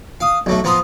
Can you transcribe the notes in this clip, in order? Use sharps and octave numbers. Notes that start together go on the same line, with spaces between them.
F5 D#6
B1 F#3 A3
F3 B3 A#5 C6 D#6